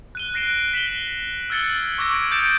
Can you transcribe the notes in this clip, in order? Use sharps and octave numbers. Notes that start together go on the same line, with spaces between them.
F#6 D#7 G7
F#6 A#6 C7 D7 E7
B6 E7 F#7 G7
E6 F6 G#6 A6 C#7 G7
C#6 D6 E6 G#6 A#6 D7
D#6 G6 A6 C#7 D7 E7